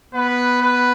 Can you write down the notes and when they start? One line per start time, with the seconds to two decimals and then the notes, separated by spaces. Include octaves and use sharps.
0.14 B3 B4
0.62 B4